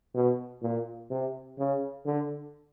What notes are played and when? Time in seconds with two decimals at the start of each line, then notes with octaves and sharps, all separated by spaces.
0.14 B2
0.62 A#2
1.10 C3
1.58 C#3
2.06 D3